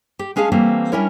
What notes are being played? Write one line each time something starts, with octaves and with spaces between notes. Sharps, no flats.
G4
G#3 C#4 G#4 F5 A5
E3 G3 A3 A#3 C4
G3 C#4 D4 E4 A#4 C#5